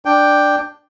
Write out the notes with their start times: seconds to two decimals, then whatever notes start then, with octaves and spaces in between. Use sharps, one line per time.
0.05 D4 G5